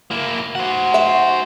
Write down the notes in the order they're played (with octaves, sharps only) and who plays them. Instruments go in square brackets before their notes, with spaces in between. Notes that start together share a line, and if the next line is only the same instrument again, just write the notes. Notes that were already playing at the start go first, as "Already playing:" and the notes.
[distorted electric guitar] A#3 E4
[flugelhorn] F#4 [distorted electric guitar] C5 F#5
[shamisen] E5